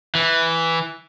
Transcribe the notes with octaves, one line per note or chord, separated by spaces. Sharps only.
E3